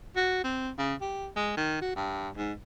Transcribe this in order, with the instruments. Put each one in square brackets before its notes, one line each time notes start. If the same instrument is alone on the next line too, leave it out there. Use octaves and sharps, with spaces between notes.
[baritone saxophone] F#4
C4
C#3
G4
G#3
D#3
F#4
G2
G#2